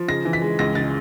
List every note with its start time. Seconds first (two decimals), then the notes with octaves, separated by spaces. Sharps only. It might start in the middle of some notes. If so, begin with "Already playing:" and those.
Already playing: F3
0.08 C#3 A#6
0.25 E3
0.33 B6
0.42 G#3
0.59 C#2 A#6
0.75 C#3 A6